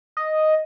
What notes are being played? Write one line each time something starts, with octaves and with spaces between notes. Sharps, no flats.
D#5